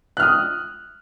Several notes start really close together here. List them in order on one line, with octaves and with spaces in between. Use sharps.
F#6 F6 D#6